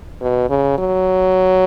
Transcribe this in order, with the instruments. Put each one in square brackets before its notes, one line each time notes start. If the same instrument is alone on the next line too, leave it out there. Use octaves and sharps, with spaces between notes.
[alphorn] B2
C#3
F#3